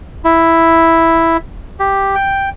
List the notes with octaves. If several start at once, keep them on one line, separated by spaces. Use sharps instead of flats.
E4
G4
G5